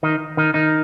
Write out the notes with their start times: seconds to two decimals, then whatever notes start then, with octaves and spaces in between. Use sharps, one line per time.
0.03 D#3 D#4
0.37 D#3 D#4
0.54 D#3 D#4